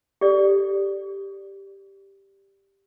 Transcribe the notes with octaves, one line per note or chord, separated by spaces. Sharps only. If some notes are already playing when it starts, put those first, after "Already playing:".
G4 A4 D5